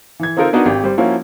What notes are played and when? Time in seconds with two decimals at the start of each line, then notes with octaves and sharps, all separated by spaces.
0.20 E3 G#6
0.37 C4 D#4 F4 A4 A#4 C5
0.53 B3 D4 D#4 F#4 A#4
0.66 G#1 G4
0.84 G3 C5
0.98 F3 A#3 C#4 E4 F#4